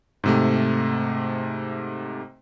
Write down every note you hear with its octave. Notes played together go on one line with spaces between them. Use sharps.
G#2 C3 A3